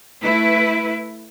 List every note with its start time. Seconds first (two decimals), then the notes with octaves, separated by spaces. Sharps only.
0.21 A3 E4 B4